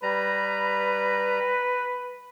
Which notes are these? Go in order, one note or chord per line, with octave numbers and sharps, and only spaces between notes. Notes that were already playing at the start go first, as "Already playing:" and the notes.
G3 B4 A#5